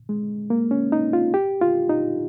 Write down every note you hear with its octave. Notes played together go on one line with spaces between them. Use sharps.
G#3
A#3
C#4
D#4
F4
G4
F4
D#4